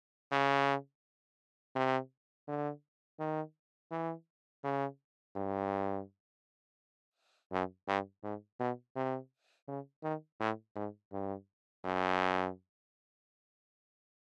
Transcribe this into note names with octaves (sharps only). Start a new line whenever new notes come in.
C#3
C3
D3
D#3
E3
C#3
G2
F#2
G2
G#2
B2
C3
C#3
D#3
A2
G#2
G2
F#2